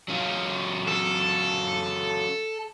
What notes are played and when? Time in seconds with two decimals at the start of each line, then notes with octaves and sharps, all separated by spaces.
0.08 F#3 C#4 F4
0.88 A4